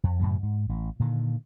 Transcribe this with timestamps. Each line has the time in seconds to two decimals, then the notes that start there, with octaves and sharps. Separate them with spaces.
0.04 F2
0.20 F#2 A2 C#3 F#3
0.43 G#2
0.69 A1
1.00 A#2 D3 D#3